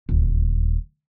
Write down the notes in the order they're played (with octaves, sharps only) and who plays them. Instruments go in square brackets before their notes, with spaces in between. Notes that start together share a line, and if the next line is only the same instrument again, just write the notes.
[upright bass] D#1 D2